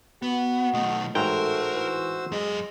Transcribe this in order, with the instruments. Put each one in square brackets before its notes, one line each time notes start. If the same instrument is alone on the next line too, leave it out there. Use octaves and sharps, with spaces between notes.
[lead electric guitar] B3 [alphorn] F#4
[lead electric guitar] B1 A3 [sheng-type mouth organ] D#5
[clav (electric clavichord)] A1 G#2 G5 [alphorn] A3 [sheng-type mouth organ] F#4 C5 E6 [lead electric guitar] A#4
[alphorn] E3
[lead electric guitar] F#2 D#5 [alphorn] G#3